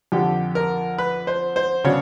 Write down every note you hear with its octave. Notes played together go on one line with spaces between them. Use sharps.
F2 D3 F3 G4
A#4
B4
C5
C5
C#3 F#3 B3 D4 C#5